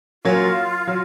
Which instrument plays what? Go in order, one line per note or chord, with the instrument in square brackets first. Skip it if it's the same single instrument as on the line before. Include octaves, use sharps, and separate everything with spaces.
[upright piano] F#3 A#3 C#4 [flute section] F4
[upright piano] F#3